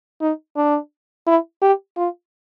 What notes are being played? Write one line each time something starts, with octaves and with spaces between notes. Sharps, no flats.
D#4
D4
E4
G4
F4